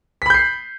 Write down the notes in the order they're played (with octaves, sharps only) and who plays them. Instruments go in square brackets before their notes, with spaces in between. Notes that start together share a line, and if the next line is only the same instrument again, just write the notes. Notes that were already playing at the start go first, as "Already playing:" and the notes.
[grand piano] B6
B5
G6
C7